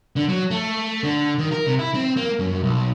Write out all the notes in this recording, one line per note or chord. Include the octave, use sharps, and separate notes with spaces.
D3
F#3
A3
D3
D#3
A#4
C3
E4
C4
A#3
F#2
B1